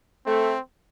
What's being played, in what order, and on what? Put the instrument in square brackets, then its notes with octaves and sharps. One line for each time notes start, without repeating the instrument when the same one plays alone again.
[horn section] A3 [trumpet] C4